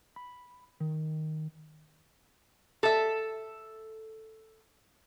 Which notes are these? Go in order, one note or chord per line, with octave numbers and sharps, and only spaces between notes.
B5
D#3
A4 E5